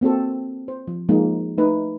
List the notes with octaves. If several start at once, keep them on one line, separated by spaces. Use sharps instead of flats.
A#3 C4 F#4 A4
C5
F3
F3 G#3 A#3 D#4
A3 D#4 B4